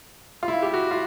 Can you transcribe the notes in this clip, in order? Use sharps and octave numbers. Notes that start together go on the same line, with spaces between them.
F4
E4
G4
F#4
F4